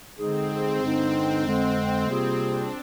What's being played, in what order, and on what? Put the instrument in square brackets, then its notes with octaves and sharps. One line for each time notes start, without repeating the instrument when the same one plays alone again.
[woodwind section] D3 G#3 D#4 G#4 [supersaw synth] C4
[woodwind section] G2 D3 G#3 D#4
F2 D3 G#3
[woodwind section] C3 G3 A#3 F4 G#4 [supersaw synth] C4
[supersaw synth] D4